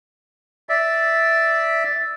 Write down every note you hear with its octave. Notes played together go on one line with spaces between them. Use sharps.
D5 E5